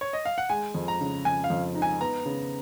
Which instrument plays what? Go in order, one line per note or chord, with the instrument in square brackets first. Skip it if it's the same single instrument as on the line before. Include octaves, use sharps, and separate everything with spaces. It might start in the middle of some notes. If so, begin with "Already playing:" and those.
[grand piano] C#5
D#5
F5
F#5
[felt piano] G#3 [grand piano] G#5
[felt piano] F2
[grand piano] A#5
[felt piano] C#3
[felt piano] F2 [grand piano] G#5
[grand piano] F5
[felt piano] F2
D#4
[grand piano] G#5
[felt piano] B3 [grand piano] A#5
[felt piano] C#3